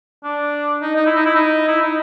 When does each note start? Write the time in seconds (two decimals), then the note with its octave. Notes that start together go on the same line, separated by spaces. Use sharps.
0.24 D4
0.81 D#4
0.96 D#4
1.06 E4
1.16 D#4
1.26 E4
1.36 D#4
1.68 E4
1.82 D#4